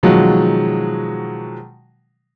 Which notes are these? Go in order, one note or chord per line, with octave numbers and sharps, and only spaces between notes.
B2 D#3 F3 F#3 G#3